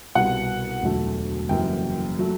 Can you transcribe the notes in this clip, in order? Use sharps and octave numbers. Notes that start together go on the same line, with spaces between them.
C2 B2 G3 F#5
E1 D2 D3 F#3 A3
F#1 F#2 E3 G3 G5
F#3 A3